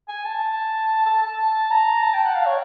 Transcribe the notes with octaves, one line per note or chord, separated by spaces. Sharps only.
G#5
A5
A5
A5
A#5
A5
G5
F#5
F5
C#5